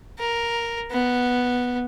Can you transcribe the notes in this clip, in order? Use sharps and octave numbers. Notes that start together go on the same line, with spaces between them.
A#4
B3